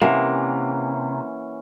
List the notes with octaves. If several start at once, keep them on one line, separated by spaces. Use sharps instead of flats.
C3 E3 A#3 C#4 E5 F#5 G#5